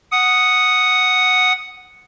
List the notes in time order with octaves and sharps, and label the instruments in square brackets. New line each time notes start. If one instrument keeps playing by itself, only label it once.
[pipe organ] F#5 D#6